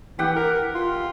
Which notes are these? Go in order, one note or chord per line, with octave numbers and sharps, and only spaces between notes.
E3 G4 F#5 G5
A#4
F4